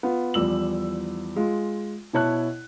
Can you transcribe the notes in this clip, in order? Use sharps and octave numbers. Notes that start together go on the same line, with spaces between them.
B3 F4
E2 E3 F3 G3 E6 F#7
G#3 F4
B2 E4 C#5 A5 F#6